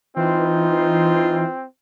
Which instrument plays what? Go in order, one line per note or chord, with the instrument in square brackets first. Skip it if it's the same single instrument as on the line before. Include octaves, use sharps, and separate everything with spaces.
[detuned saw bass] E3 [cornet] C4 [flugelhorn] D#4 [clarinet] F4